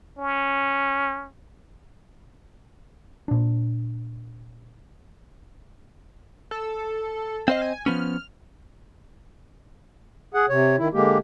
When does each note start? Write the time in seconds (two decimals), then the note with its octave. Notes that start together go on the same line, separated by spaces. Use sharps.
0.18 C#4
3.28 A#2 D4
6.51 A4
7.48 C4 C5 D#5 F5
7.62 G#5
7.86 F3 B3 C#4 F6
10.34 G#4 F#5
10.49 C3 C#5
10.79 D#3 E4
10.94 D3 G#3 A#3 G4